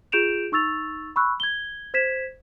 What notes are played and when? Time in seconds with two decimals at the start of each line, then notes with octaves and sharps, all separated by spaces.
0.12 F4 G#4 G6 D7 E7 F7
0.52 D#4 C#6 E6 A6 F7
1.16 B5 C#6 E6 F#6
1.40 G#6 G7
1.94 C5 G#6 B6 E7